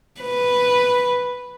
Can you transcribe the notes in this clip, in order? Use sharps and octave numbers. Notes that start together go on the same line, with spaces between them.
B4